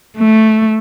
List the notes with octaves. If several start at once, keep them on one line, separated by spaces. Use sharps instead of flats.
A3